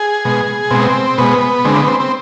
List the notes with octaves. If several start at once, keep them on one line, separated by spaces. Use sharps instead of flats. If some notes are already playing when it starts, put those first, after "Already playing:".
Already playing: G#4
B2 G#3
B2 G#3 C4
B2 G#3 B3
D3 G#3 C4
B3
C4
C4